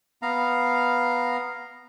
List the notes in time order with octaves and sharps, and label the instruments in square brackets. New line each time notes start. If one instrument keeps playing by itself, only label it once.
[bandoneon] B3 F5 A#5